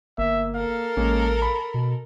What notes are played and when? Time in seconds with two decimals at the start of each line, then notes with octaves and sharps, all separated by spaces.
0.18 G1 A#3 E5
0.55 A4 A#4 F5
0.97 A1 G#3 A#3 C#4
1.42 B5
1.74 B2